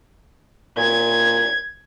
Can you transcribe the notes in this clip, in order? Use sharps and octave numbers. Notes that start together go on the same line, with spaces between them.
A#2 G#6